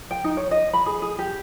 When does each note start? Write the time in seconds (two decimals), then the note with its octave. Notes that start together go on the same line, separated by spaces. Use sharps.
0.11 G5
0.24 D#4
0.37 C#5
0.51 D#5
0.73 B5
0.86 G#4
1.02 G#4
1.19 G4